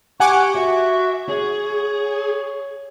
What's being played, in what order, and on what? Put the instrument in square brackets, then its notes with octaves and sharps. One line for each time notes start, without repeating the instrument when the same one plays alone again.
[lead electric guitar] G4 [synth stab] F#5 G#5 D6 [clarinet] C#6
[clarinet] F#4 [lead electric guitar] E5
[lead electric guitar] G#4 [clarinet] C#5